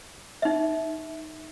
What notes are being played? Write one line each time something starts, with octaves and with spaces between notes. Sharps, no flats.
D#4 E5